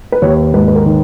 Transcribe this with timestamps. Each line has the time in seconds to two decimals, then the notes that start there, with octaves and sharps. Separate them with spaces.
0.12 B4
0.22 D#2 C#5
0.54 G#2 B4
0.68 B4
0.75 A#4
0.86 D#3